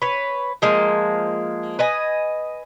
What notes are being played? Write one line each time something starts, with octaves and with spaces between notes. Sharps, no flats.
B4 C#5
F3 G#3 A#3
B4 D#5 G#5